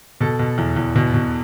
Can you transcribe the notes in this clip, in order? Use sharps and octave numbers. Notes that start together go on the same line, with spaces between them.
B2 A4
B2
E2
E2
B2
B2